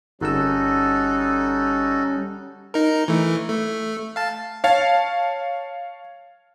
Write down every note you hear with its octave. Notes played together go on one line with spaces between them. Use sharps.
G1 G3 C#4 D#4 F#4 A4 E6
D#4 A#4
E3 A3
A3
F5 A5
C#5 F5 A5